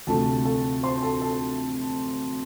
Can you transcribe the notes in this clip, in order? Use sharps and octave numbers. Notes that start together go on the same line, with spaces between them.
D2 C3 F3 A3 A4 A5
A4 A5
C5 C6
A4 A5
A4 A5